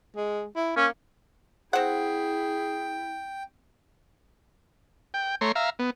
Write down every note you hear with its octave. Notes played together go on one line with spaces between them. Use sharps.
G#3
E4
A#3 C#4
C4 E4 G#4 F#5 G5
G5
A3 C#5 A#5 C6
E5 F5 A#5
B3